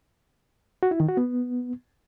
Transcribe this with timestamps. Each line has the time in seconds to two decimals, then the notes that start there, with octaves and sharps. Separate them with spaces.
0.83 F#4
0.91 E4
1.00 D#3
1.09 F#4
1.17 B3